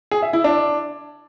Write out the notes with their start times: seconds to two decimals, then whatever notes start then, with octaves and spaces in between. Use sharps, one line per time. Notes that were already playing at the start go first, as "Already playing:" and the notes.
0.11 G#4
0.22 E5
0.33 E4
0.44 D4